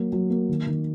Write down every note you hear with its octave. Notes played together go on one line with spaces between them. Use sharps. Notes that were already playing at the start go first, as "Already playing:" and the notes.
Already playing: F#3 A#3
F#3
A#3
D#3
D#3